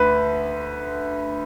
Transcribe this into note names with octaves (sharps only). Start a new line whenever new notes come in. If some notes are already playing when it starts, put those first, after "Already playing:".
Already playing: D2 D3 B4